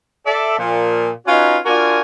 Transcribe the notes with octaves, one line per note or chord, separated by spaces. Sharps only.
A4 D5 E5
A#2 F3
C#4 D#4 F4 F#4 B4 C#5
D4 F4 F#4 A#4 D5 G#5